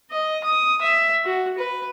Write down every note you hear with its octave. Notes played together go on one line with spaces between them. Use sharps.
D#5
D#6
E5
F#4
B4